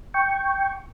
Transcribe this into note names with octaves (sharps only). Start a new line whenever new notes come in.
G5 C#6